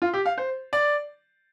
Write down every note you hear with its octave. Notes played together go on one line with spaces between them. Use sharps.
F4
G4
F5
C5
D5